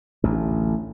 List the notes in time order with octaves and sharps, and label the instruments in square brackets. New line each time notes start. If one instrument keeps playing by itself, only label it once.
[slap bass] A1 D2